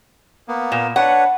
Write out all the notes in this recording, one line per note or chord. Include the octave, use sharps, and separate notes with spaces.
A#3 B3
A#2
D4 B4 C#5 F#5